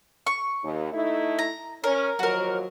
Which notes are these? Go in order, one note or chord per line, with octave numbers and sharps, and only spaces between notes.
C#6
D#2
A3 D#4 E4
A#5
C#4 A#4
D#2 F3 F#3 F#4 A#4